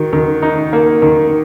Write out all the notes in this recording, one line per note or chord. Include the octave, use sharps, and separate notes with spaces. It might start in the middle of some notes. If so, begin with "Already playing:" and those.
Already playing: D#3 F#4
D#3
D#4
A#3
D#3